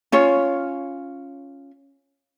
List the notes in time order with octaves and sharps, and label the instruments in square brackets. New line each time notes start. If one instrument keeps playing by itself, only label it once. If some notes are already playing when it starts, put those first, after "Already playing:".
[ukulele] C#4 F4 C#5